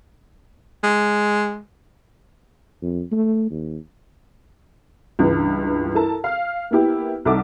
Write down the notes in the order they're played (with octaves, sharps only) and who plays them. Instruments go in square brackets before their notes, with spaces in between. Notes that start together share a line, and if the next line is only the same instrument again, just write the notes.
[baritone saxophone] G#3
[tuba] F2
A3
D#2
[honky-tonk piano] C#2 G2 E3
E4 A4 A#4 A5 A#5
F5 F6
A#3 B3 E4 G4
C2 D#4 A4 E5 F#5 D6